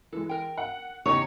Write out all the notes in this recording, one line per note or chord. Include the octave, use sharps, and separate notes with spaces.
E3 G#3 A4
A#4 G5
F#5
E2 C#3 D#4 G4 C#5 C#6